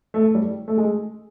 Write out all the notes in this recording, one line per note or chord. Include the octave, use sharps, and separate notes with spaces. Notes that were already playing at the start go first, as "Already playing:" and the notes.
A3
G3
A3
G#3